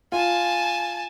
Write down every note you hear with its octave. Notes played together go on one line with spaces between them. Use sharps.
F4 G#5 A5